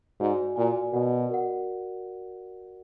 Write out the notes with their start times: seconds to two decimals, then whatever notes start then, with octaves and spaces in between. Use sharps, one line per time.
0.20 G#2 F#4 D5 G#5
0.56 A#2 F#4 D5 G#5
0.93 B2 F#4 A#4 D5 F#5
1.29 F#4 A#4 D5 F#5